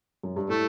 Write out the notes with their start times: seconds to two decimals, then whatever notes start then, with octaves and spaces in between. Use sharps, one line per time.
0.23 F#2
0.36 G2
0.49 A2 A3